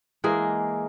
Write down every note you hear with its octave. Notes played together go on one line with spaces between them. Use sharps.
E3 G#3 A#3 G#4